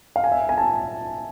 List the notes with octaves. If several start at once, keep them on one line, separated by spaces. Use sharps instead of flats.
F5
G#5
E5
G#5
A5